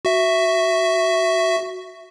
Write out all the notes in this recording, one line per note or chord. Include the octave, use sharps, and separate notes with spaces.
F#4 E5